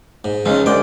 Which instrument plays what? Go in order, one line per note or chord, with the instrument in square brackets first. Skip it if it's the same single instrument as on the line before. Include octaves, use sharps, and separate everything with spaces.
[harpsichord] G#2
[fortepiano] C#2 [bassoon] G#2 [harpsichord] C#4 D#4
[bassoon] F#2 [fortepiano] D3 G#3 D5 [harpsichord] G5